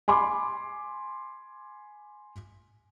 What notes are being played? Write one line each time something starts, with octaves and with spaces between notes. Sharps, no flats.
G#5 B5 C6 D6